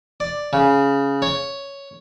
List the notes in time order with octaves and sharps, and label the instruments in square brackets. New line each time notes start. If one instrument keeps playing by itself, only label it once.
[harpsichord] D5
C#3
C#5